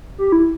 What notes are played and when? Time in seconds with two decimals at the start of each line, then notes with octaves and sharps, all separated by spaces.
0.18 G4
0.32 E4